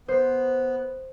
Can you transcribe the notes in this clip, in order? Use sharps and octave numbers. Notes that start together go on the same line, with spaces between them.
B3 C5